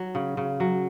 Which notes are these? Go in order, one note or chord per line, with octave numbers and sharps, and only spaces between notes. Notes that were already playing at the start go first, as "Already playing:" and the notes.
Already playing: F#3
C#3
C#3
F#3